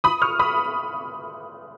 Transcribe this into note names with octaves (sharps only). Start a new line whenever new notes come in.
B5 D#6
C#6 F6
B5 D#6